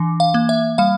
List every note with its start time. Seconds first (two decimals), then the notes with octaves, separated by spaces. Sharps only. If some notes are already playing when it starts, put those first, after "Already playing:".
Already playing: E3 D4
0.20 F5
0.34 A#3
0.49 E5
0.78 G3 F5